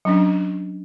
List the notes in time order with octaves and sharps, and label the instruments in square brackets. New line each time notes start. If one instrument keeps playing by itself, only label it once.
[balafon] F#3 C#4 D4